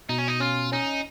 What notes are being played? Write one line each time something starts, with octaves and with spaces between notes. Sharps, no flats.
B2 D#4
C#4
D#4
C#4 F4
C#4 D#4